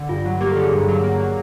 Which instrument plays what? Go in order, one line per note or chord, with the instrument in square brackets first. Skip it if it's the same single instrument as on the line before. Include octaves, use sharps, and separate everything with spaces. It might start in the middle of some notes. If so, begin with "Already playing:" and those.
Already playing: [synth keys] D3
[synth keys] G2 [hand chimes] F4
[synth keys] F#3
[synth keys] A#3 [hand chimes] G4
[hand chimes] A4
[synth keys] D3 [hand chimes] G#4
[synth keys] G2
F#3
A#3
F#3